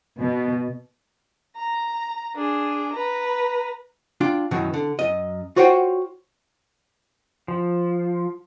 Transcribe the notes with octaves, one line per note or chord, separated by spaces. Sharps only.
B2
A#5
D4 G#4
B4 A#5
D4 F4 G5
F#2 B2 D#3 E3
D3
F#2 D#5
F4 F#4 C5 C#5 F#5 G5
F3